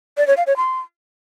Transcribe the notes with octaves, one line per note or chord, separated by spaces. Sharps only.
D5
C#5
F5
C#5
C6